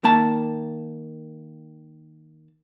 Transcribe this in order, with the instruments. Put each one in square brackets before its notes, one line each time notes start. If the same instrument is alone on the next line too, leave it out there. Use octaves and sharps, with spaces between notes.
[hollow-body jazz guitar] D#3 A#3 A5